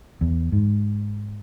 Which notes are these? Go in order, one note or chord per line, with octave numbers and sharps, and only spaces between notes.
E2
G#2